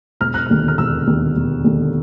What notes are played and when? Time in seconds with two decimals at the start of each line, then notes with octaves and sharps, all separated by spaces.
0.20 E1 F6
0.34 F#6
0.46 D#2 D3 F6
0.68 F6
0.78 E1 E6
1.07 D#2 D3
1.36 E1
1.64 D#2 D3